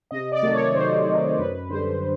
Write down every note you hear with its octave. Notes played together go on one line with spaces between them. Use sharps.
C3 D#5
D5
D#3 F#3 A3
C#5
C3 C5
D#3 F#3 A3
F#2 B4
D3 G3 C5